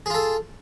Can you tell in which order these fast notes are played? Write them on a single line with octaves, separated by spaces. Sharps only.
G#4 F4 A4